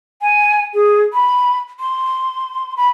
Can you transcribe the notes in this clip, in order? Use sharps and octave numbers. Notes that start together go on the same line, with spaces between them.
G#5
G#4
B5
C6
B5